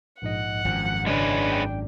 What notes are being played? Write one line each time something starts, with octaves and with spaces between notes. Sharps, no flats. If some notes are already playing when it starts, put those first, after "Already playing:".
A#1 G#2 D#5 F#5
G#1 F#2 F3
C#3 G#3 C#4 D4 B4
G5